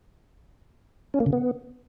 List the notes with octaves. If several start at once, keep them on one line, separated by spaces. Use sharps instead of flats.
C#4
A#3
C#3
B3